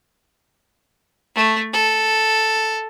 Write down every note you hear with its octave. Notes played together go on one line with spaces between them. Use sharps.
A3
A4